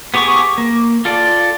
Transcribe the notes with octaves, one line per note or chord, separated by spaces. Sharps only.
B3 G4 G#4 C#6 D6
A#3
F4 A4 D5